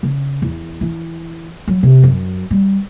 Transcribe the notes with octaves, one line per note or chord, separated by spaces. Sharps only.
C#3
E2
E3
F#3
C3
F#2
G3